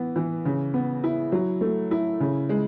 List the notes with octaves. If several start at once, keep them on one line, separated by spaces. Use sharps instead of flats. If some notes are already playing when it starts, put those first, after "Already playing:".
Already playing: E3 B3
E3
C#3
B3
E4
F#3
A3
E4
C#3
G#3